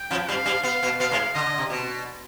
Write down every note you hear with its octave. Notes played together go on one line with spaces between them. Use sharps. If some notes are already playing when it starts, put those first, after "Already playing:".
Already playing: G5
F2 F3
G2 G3 F5
G2 G3
B3 F5
B2 B3
B2 B3 F5
G#2 G#3
D3 D#5
D3
C3
B2